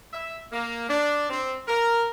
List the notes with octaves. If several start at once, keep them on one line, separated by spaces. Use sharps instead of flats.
E5
A#3
D4
C4
A#4